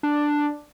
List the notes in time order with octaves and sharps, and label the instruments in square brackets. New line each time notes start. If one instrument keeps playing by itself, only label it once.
[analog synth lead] D4